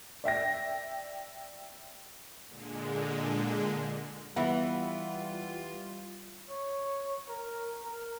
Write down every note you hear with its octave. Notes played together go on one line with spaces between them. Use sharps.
D5 E5 G5 A#6
A#2 D3 G#3
E3 G3 B3 F4 E5 F#5
C#5
A#4
A#4